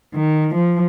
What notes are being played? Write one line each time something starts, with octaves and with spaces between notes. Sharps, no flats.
D#3
F3